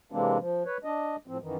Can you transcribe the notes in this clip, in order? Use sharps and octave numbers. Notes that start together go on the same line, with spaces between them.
C3 E3 G#3 A#3 C4 D4
F3
B4 C#5
D4 D#5
A2 F3 C4
F#2 D#3 E3